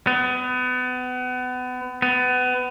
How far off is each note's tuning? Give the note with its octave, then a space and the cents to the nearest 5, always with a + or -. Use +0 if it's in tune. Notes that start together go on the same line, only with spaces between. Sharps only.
B3 +30
B3 +25